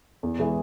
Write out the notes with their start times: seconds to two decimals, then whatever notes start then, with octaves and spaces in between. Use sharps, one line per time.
0.23 E2
0.39 E3 G#3 E4 G#4